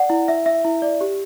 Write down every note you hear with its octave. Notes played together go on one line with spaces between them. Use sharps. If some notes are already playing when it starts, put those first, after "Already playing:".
Already playing: D5 F#5
E4
E5
E5
E4
D5
G4